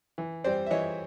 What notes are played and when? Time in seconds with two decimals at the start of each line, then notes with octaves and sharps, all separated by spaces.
0.18 E3
0.44 G3 C4 C5 D5
0.67 E5
0.71 E3 C#5 D#5